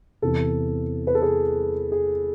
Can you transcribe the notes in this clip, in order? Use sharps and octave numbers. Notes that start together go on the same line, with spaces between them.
E2 C3 E3 A4
B4
A4
G#4 B4
G#4